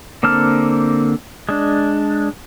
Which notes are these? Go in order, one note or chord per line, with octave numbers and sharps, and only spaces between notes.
D3 A#3 C4 A5 F6
G#3 D4